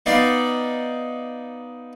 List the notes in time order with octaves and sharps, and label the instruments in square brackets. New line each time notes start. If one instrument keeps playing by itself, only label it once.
[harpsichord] B3 D#4 D5 F5